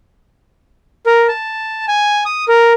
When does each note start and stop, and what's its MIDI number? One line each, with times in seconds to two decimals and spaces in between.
1.06 1.27 70
1.28 1.86 81
1.88 2.24 80
2.26 2.45 87
2.48 2.73 70